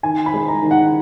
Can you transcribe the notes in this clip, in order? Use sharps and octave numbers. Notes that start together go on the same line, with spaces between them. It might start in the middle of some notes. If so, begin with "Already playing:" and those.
D#3 G#5
B5
G#3
A#5
D#3
F#5